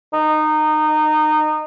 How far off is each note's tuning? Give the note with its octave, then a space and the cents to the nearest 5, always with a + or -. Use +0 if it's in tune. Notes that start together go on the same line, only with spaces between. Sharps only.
D#4 -20